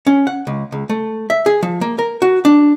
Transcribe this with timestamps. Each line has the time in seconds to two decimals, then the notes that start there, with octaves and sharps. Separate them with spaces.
0.07 C#4
0.27 F#5
0.47 C#2
0.72 C#2
0.89 A3
1.30 E5
1.46 G#4
1.63 F3
1.81 A#3
1.99 A#4
2.22 F#4
2.45 D4